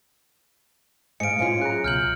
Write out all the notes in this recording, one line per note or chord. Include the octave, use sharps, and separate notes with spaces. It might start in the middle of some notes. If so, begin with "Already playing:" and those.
G#2 D#5 F5 C#7 D7
F#2 C#4 F4
G#4 A#5 F#6
C#2 B2 F6 G6 F#7